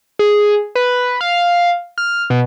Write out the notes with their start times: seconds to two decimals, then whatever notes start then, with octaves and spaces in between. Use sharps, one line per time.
0.19 G#4
0.75 B4
1.21 F5
1.98 F6
2.30 B2